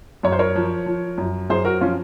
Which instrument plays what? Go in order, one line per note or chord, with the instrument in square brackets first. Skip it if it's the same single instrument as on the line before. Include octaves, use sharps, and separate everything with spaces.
[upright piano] F#2 C#5
C5
A#4 C#5
F3
F3
F#2
F#2 G#4 C5
F#4 A#4
F3 C#4 F4